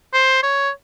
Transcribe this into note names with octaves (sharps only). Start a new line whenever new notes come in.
C5
C#5